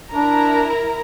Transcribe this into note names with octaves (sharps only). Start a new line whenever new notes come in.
D4 E4 A#4 A#5